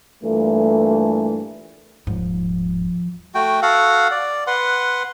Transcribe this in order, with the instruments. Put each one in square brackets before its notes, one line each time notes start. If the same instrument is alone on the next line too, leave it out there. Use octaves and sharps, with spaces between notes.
[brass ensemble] G2 A#2 E3 A3
[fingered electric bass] D#1 G#2 [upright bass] F3
[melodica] A3 F#4 G5
F#4 A4 F5 F#5
D5
B4 F#5 C6